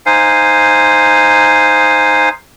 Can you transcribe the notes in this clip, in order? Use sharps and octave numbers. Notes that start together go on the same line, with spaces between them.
D#4 C5 F5 G#5